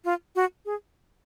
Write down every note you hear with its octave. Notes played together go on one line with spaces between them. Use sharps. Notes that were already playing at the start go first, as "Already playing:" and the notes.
F4
F#4
G#4